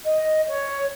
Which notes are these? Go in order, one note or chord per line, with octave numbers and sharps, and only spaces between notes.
D#5
C#5